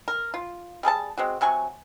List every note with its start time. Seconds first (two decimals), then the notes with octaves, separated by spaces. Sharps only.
0.08 A#4
0.34 F4
0.83 G3 G#4 A4 A5
1.18 G#3 C4 F#4
1.41 C3 F#3 G#5 C#6